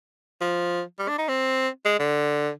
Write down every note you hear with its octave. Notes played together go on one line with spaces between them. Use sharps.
F3
G3
D4
D#4
C4
G#3
D3